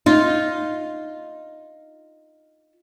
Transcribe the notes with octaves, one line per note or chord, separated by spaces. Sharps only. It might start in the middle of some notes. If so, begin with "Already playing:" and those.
D#4 F4